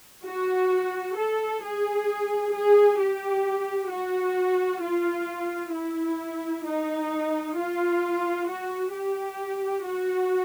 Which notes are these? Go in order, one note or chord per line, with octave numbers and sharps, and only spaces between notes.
F#4
A4
G#4
G#4
G4
F#4
F4
E4
D#4
F4
F#4
G4
F#4